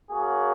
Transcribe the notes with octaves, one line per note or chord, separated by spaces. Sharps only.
A#3 C#4 F#4 G#4